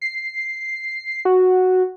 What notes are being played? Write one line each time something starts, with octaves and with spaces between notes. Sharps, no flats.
C7
F#4